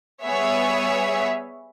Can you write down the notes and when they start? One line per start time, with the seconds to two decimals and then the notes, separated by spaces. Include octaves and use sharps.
0.22 G3 B3 G#4 C#5 E5